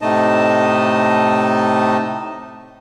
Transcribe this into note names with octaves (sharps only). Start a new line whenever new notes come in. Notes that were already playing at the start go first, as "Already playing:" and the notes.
A2 C3 A3 D#4 D#5 A5